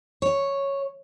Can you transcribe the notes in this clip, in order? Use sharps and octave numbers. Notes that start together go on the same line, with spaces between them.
C#5